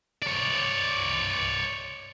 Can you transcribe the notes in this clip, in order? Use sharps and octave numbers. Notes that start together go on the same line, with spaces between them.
C#5 D5